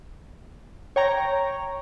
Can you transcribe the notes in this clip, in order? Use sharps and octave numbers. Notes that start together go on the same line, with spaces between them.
C#5 G5 A#5 C#6